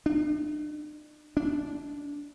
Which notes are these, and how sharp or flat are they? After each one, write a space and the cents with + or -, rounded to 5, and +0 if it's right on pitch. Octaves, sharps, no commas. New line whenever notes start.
D4 +40
D4 -20